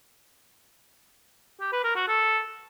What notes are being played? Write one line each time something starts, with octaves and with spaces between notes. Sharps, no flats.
G4
B4
A#4
F#4
A4